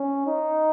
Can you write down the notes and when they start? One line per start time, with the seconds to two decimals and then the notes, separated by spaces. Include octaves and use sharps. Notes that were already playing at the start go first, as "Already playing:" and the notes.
Already playing: C#4
0.27 D#4